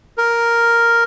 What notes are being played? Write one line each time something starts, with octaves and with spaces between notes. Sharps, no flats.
A#4